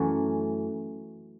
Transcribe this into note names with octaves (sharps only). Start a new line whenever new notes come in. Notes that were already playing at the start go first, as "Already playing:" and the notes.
Already playing: F#2 E3 A3 C#4